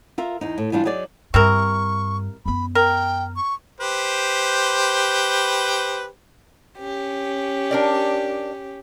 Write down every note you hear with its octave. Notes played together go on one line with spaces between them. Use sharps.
F4 A#4 E5
E2 D#4
A2
E3 G3 D4 F4
F#3 D#4 G#4 D5
G2 C3 E4 A#4 C#6
F#2 B3 B5
A#4 G5
C#6
G4 B4 C5
C#4 G4
D4 A#4 D5